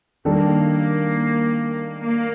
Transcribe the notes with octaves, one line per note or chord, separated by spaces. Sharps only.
D#3 G3 A#3 D4 A4
A#3